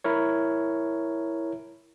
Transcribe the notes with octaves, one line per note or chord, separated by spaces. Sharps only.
E4 A#4 C#5